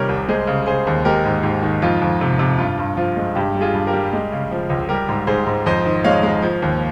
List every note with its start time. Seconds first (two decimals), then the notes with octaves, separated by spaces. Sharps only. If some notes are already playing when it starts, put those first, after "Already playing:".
Already playing: C3 D#3 G3 A#4 C#5
0.09 C2
0.29 G#3 G#4 C5
0.47 C#3
0.66 C#3 G#4 C5
0.87 D#2
1.05 G#3 G4 A#4
1.25 G#2
1.43 G#2 G4
1.63 D#3
1.82 F2 F4
2.01 F2
2.21 C3
2.39 C3
2.58 G2 F4
2.79 G2
2.97 F3 F4
3.17 G#3
3.35 G2 G4
3.54 G3
3.61 F4 G#4
3.74 G2
3.87 G4 A#4
3.93 G3
4.13 G#3
4.32 C#3
4.51 F3
4.70 C#2
4.89 G3 G4 A#4
5.09 G#2
5.27 G#2 G#4 C5
5.46 G#2
5.66 F2 C5 D#5
5.86 D#3
6.04 G#3 C#5 F5
6.23 G#3
6.42 F3
6.62 D#2